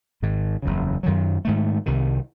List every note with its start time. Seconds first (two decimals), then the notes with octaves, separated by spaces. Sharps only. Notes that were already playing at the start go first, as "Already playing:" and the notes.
0.22 G#1 G#2 D#3
0.62 F#1 E2 C#3
1.03 F#2 D#3 F#3
1.45 G#2 D#3 A3
1.86 C2 C3 D#3